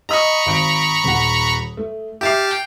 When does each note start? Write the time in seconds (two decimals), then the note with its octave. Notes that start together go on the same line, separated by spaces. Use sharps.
0.09 D#5 A#5 B5 C#6 D#6
0.46 G#1 D7
1.04 D#1 F#5
1.77 A3
2.21 G4 E5 A5 D6 F6 C7
2.51 G5